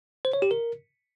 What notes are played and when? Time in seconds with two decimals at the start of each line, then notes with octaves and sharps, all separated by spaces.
0.25 C5
0.33 C#5
0.42 G4
0.51 A#4